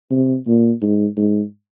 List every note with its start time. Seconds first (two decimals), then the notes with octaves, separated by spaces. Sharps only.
0.11 C3
0.47 A#2
0.82 G#2
1.17 G#2